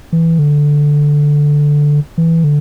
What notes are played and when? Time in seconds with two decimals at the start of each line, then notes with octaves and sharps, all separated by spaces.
0.13 E3
0.39 D3
2.18 E3
2.44 D3